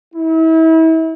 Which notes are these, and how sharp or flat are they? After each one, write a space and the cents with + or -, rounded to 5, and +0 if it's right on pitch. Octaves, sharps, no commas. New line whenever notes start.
E4 -35